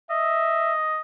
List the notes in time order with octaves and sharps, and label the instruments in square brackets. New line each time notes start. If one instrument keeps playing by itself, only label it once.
[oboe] D#5 [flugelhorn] E5